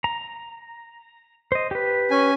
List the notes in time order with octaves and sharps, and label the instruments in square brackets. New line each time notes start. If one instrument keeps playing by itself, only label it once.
[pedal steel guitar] A#5
C5 D#5
G4 B4
[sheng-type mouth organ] C#4 G#5